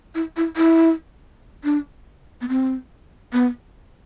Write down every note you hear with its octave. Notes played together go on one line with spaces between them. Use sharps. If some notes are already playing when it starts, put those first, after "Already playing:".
E4
E4
E4
D4
B3
C4
B3